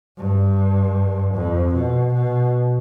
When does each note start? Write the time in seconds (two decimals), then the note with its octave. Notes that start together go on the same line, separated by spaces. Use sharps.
0.18 G2
1.35 F2
1.75 B2
2.14 B2